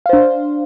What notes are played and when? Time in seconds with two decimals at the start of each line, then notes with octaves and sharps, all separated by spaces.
0.06 F5
0.09 C5
0.13 D4